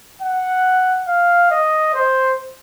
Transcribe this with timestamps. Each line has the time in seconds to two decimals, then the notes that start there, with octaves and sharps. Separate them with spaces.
0.22 F#5
1.07 F5
1.51 D#5
1.94 C5